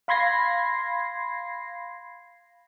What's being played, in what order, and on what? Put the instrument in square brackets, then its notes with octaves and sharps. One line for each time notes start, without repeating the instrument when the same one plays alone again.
[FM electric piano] F5 B5 C6 G#6 A#6 C7